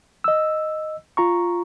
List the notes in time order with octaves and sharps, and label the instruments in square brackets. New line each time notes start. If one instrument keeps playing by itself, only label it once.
[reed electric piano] D#5 E6
F4 A#5 C#6